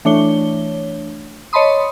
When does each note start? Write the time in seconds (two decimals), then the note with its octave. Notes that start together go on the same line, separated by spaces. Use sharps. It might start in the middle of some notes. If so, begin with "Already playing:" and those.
0.05 E3 A3 D4 C#5 G7
1.53 C#5 D#5 A5 B5 C6 D#6